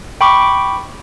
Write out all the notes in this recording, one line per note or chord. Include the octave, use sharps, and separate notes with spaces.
G5 B5 C#6 D6